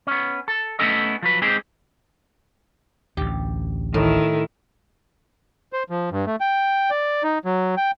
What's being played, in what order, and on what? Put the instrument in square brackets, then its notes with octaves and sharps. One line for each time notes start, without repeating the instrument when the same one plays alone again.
[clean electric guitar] B3 C#4
A4
A3 B3 C#4 E4 A4 D#5
F3 F#3 B4
G#3 C4 D#4 G4 G#4 C5
[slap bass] A1 D2 [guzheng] G4
[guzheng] A2 [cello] D#3 E4
[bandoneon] C5
F3
G2
A3
G5
D5
D#4
F#3
G5